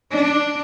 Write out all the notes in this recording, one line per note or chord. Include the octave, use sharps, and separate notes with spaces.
D4